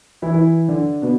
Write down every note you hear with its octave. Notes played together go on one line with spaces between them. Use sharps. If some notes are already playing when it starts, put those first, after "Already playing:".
E3 E4
E3 E4
D3 D4
B2 B3